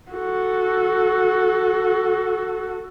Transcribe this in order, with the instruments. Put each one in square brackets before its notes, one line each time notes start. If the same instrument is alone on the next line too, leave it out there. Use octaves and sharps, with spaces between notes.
[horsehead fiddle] F#4 A4